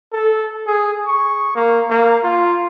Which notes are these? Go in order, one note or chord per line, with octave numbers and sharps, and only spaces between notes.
A4
G#4
C#6
A#3
A#3
F4